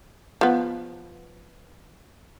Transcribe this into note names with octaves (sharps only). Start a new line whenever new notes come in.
F3 B3